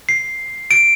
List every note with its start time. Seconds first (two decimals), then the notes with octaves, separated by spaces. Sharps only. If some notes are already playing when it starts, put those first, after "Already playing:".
0.09 C7
0.71 D7